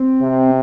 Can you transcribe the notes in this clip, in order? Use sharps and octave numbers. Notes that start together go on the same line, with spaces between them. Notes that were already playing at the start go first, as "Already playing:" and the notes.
Already playing: C4
C3